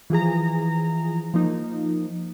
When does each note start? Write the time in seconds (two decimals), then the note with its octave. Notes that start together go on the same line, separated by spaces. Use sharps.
0.10 E3 F3 G#4 A#5
1.34 F3 A#3 D#4